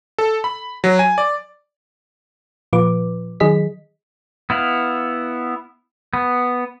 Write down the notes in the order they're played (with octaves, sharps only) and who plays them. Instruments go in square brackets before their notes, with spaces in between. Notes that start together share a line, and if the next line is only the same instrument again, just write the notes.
[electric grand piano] A4
B5
F#3
G#5
D5
[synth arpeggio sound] A#2 F3 F4 B4 D6
D#3 F#3 G#4 D#5 B6
[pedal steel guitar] B3 E4 F5
B3